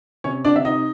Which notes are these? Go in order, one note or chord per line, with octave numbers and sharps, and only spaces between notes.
C3 C#4 C#5
D4 D5
C3 E5
D#4 D#5